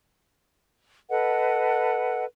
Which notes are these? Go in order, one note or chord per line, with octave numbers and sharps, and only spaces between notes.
A4 B4 D#5 F#5